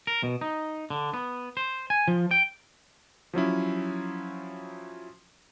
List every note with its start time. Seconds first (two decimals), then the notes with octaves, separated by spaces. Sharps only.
0.07 A#4
0.23 B2
0.41 D#4
0.90 D3
1.14 B3
1.57 C5
1.90 G#5
2.08 F3
2.31 G5
3.34 F3 F#3 C#4 E4